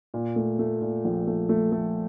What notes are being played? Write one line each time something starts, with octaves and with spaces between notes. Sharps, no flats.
A#2
A3
A3
A#2
A#1
A3
A3
A3